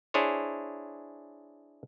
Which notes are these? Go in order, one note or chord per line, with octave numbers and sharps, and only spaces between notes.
D4 E4 G#4 C5 C#5